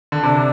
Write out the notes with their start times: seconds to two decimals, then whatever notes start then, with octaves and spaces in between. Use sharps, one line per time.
0.12 D3
0.23 C3 D4